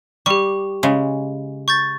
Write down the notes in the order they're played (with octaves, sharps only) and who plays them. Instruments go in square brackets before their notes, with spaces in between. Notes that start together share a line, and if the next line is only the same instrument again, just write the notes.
[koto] G3 [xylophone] G4 C#6
[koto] C#3 G#3
[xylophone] C#6 G6 A6